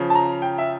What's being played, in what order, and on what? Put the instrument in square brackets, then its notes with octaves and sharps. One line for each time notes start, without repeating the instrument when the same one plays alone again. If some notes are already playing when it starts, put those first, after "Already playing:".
Already playing: [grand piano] C#3 F3
A5
A#5
G5
E5